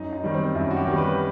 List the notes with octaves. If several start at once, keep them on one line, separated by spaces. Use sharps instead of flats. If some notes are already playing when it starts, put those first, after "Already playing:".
Already playing: F#2 D#4
D#4
D#3 G3
C4
F#2 E4
F#4
G4
D#3 G3
B4